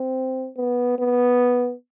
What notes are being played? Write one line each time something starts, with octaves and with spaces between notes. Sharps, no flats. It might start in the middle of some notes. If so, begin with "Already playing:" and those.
Already playing: C4
B3
B3